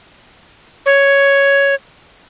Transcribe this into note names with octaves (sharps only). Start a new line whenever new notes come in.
C#5